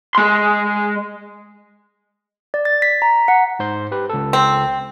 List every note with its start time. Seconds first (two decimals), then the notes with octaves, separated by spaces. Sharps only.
0.15 G#3 C6
2.54 D5
2.65 A6
2.82 B6
3.02 A#5
3.28 F#5
3.59 G#2 C5 C6
3.92 G4 B4
4.10 C#2 A4
4.33 C4